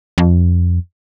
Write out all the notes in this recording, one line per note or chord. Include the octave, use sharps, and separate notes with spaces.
F2